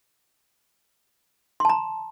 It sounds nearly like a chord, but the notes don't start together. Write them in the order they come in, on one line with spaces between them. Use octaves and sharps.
C6 A5 A#5